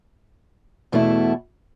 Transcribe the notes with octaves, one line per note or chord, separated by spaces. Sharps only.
E2 B2 A3 E4